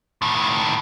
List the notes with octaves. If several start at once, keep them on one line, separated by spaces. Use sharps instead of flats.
A2 D#3